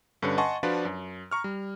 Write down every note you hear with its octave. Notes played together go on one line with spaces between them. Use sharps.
G2 D3 C#4 B4 C#7
D#5 F#5 G#5 A5 C6 C#6
F3 D4 F4 F#4 B4 D5
F#2
A#5 C#6 F6
G3